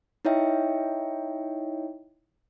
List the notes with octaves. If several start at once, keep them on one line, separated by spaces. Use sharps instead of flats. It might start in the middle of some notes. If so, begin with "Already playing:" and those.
D#4 E4 C#5 D#5 E5 G5